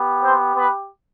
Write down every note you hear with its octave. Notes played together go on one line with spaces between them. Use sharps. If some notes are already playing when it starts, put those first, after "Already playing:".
Already playing: B3 G4
C4 C5
B3 B4